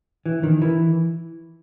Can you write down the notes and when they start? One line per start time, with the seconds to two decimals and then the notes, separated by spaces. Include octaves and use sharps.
0.26 E3
0.43 D#3
0.62 E3